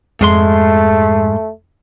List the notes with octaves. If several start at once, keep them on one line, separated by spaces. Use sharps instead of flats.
F2 G#2 G#3 A3 C6